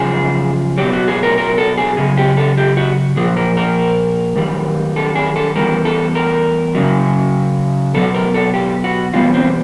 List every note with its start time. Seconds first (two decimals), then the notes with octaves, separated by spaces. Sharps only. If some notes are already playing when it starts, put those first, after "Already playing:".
Already playing: F#2 C#3 F3 G#4
0.78 B2 F#3 G4
0.93 F#4
1.08 G#4
1.23 A#4
1.38 A#4
1.58 A4
1.78 G#4
1.97 F#2 C#3 G#4
2.18 G4
2.37 A4
2.57 G4
2.77 F#4
3.16 A#2 F3 G#4
3.37 A#4
3.57 A#4
4.36 F#2 D#3 G3
4.96 A4
5.15 G#4
5.36 A4
5.56 E2 B2 G3 A#4
5.85 A4
6.15 A#4
6.75 F#2 C#3 F#3
7.94 B2 F#3 A4
8.14 A#4
8.34 A4
8.54 G4
8.84 F#4
9.14 E2 B2 G3 F4
9.34 C4